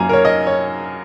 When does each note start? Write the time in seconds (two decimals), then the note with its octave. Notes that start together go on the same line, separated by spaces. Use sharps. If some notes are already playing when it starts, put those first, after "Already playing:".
Already playing: F#2 F#3 A#3 G#5 A#5
0.09 A#4
0.13 C#5
0.25 D#5
0.47 C#5